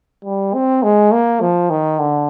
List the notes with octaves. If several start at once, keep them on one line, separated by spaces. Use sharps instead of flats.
G3
C4
G#3
A#3
F3
D#3
D3